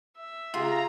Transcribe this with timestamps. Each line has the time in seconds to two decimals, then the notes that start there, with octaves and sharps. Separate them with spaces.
0.16 E5
0.54 C#3 F4 G4 G#4 A#5